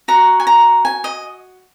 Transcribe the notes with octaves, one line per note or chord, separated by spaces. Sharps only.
F#4 C#5 A#5
G#5
A#5
G#5
D#5